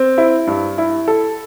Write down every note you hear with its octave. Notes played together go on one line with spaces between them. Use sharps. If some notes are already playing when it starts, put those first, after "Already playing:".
Already playing: C4
E4
G2
E4
A4